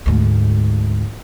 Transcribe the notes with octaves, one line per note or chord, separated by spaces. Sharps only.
D2 G#2